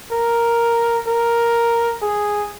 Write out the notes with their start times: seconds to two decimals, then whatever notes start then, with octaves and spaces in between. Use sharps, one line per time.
0.12 A#4
1.07 A#4
2.02 G#4